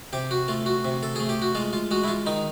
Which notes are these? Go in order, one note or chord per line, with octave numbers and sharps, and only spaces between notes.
C3 G4
F#4
A3 F4
F#4
C3
A4
A3 G#4
G4
F#4
G#3 F4
F4
G#3 F#4
E4
F4
D#3 D#4